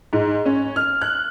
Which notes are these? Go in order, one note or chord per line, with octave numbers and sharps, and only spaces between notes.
G#2
C#4
F6
F#6